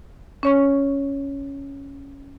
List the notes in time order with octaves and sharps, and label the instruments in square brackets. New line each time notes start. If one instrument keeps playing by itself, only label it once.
[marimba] C#4 C#5 C#6